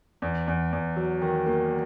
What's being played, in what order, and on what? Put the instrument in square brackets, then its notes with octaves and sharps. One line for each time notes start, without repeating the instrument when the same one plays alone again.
[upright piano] E2
E2
E2
F#3
D#3
A#3